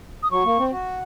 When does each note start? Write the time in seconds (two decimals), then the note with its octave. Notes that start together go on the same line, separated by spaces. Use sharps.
0.23 D#6
0.31 F#3 C#6
0.45 A#3
0.59 C4
0.72 F#4